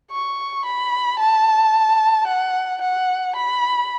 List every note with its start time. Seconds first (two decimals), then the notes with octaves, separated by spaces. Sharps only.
0.11 C#6
0.65 B5
1.19 A5
2.27 F#5
2.81 F#5
3.36 B5